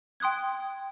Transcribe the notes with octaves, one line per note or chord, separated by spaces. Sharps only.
G5 C6 D#6 F#6 G#6